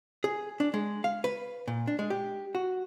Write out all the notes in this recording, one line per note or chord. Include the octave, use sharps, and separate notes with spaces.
G#4
D4
G#3
F5
B4
A#2
D4
G#3
G4
F#4